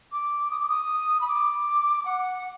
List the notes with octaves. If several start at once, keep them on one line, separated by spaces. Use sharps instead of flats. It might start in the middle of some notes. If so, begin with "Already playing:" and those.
D6
D#6
D6
D#6
B5
D6
F#5